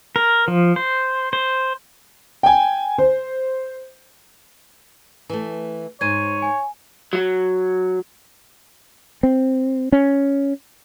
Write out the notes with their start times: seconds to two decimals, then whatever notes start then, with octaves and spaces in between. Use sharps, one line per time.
0.16 A#4
0.48 F3
0.76 C5
1.33 C5
2.43 G5 G#5
2.98 C5
5.30 E3 A3
6.01 G#2 C5 C#5 G#6 D#7
6.42 G#5
7.13 F#3
9.23 C4
9.92 C#4